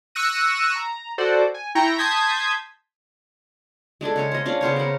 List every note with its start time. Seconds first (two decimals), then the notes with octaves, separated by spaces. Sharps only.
0.15 C#6 E6 F#6 A#6 D#7
0.75 A#5
1.18 F#4 A4 C5 D5 F#5
1.54 G#5
1.75 E4 G5 A#5 C#6
1.98 A5 C6 D#6 G6 G#6 B6
4.01 G#3 D4 G#4 A4
4.16 C#3 C#5 G#5
4.31 C5 D#5
4.46 C#4 D4 F4
4.61 C#3 B3 C5 C#5
4.76 A#4 F#5